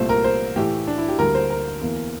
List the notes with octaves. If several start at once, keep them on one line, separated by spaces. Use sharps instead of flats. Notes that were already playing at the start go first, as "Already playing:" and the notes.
Already playing: C2 A#2 A3 C5
A#4
C5
A2 E3 A3 G4
D4
E4
G4
D2 D3 G3 A#3 A#4
C5
A#4
E2 E3 A#3